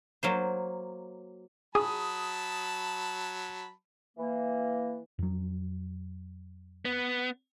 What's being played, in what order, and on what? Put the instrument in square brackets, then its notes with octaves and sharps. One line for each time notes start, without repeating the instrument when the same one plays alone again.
[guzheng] F#3 A#3 C5
[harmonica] F#3 A5 B5 [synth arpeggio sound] G#4 [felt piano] D#6
[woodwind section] E3 A#3
[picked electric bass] F2 F#3
[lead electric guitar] B3